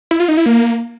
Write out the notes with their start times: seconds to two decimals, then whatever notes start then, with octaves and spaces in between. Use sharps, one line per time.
0.11 E4
0.20 F4
0.28 D#4
0.37 E4
0.46 A#3